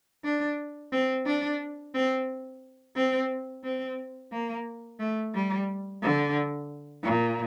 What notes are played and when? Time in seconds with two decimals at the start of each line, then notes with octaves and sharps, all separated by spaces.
0.24 D4
0.92 C4
1.26 D4
1.94 C4
2.96 C4
3.64 C4
4.32 A#3
5.00 A3
5.34 G3
6.02 D3
7.04 A#2